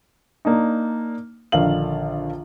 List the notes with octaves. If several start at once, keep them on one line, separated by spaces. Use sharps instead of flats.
A#3 D4 D#4
A#1 D3 D#3 F5 F#7